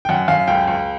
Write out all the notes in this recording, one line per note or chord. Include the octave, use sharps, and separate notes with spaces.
G5
F#2 F#5
F#2 F5
C#2 G5
C#2